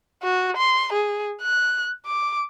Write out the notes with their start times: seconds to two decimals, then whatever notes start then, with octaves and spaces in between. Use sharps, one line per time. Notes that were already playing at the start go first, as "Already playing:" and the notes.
0.23 F#4
0.57 C6
0.93 G#4
1.42 F#6
2.06 D6